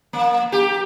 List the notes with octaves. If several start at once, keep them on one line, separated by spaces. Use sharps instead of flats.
A#3
G4